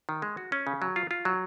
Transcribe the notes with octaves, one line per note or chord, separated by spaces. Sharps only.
D#3
G#3
F#4
C#4
C#3
F#3
F4
F4
F#3